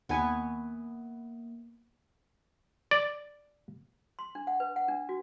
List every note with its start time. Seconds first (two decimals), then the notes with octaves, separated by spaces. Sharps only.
0.09 D#2 A#3 B3 B4 G#5 C#6
2.91 D5
4.19 C6
4.35 D4
4.47 F#5
4.60 B4
4.76 F#5
4.88 D4
5.09 F#4